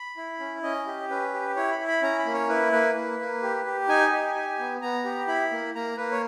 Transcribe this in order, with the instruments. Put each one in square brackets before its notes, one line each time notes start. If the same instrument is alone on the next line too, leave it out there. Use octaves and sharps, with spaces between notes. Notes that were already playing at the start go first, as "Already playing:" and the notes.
Already playing: [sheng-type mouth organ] B5
E4
C#4
C#4 D#5
G4
C#4 B4
G4
E4 C#5
B5
E4
B5
C#4 A#5
B5
A#3
C#5
E4 B4
A#3 B4
A#3
A#3
G4
G4
D#4 G#5
G4
G4
B3
B3 A#5
G4
E4 B5
A#3
A#3 A#5
A#3 B4
C#5